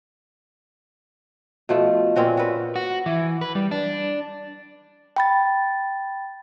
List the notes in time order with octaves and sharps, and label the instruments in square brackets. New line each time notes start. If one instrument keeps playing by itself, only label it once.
[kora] B2 F3 A3
A#2 C4 C#4 F#4
F#4 B4
[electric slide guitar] F#4
E3
B4
G3
D4
[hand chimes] G5 B5 A6